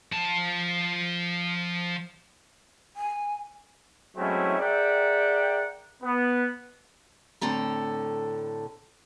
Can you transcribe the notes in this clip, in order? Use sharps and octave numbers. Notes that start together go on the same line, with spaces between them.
F3 A5
G#5
F#3 G#3 A3 C4 C#4 E4
G#4 A#4 D5 E5 F#5 G5
B3
A2 D3 C4 A4 A#5